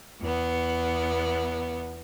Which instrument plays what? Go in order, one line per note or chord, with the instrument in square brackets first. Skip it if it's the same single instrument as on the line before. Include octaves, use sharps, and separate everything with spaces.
[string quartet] E2 B3